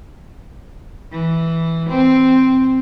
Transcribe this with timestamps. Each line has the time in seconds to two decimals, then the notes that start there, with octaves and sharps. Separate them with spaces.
1.12 E3
1.89 C4